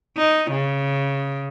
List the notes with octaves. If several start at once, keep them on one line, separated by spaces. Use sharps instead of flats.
D#4
C#3